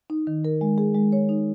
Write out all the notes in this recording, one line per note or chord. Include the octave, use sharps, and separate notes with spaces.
D#4
D#3
A#4
G#3
G#4
G#3
C#5
D#4